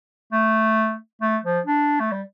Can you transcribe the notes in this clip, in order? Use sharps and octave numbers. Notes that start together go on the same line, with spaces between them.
A3
A3
F3
D4
A3
G3